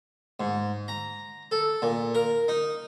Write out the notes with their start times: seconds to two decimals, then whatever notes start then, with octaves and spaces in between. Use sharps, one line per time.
0.40 G#2
0.88 A#5
1.51 A4
1.82 A#2
2.15 A#4
2.48 D#4